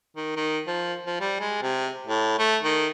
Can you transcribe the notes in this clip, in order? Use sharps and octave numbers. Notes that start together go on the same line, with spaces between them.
D#3
D#3
F3
F3
G3
G#3
C3
A2
A3
D#3